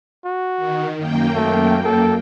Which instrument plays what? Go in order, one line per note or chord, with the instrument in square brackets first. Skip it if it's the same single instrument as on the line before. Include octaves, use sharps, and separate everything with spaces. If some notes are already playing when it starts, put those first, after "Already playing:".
[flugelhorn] F#4
[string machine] D#3
F#2 A#3 G5
[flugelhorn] A3
A4